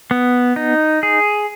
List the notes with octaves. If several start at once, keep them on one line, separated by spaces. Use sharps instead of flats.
B3
D#4
G#4